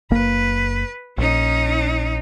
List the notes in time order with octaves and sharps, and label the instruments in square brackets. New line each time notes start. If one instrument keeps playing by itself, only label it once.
[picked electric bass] F#1 A#3 [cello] B4
[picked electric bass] A#1 [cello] C#4 D#4